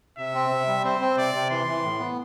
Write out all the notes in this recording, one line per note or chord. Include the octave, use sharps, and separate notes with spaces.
C3 E5
C4
C3
G3
C4 C5
C4
C3 D5
C3
E3 C6
E3
A2
B3